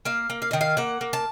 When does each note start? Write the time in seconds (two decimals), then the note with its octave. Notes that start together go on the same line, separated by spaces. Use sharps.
0.05 A#3 F5
0.30 A#3
0.42 F5
0.51 D#3 D#5
0.61 F5
0.77 A#3 F#5
1.01 A#3
1.13 A5